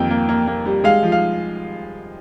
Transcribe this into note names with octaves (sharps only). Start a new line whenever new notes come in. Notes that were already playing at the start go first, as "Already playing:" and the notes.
Already playing: F2 D#3 G3 A#3 G5
A#3
A#3
A#3
G3
G#3 F5
F3
F5